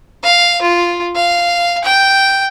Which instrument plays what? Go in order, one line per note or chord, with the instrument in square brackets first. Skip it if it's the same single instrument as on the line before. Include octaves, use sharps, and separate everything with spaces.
[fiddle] F5
F4
F5
G5